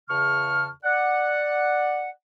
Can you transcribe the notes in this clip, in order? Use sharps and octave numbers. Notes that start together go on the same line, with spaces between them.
E2 C#3 A5 C#6 F6
D5 F#5